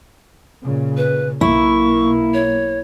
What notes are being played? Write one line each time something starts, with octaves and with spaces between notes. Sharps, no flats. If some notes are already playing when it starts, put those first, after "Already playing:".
A#2 C#3
B4
B1 A#3 E4 C#6
C#5